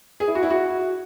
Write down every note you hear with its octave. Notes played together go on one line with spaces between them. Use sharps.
G#4
E4
F#4
E4
F#4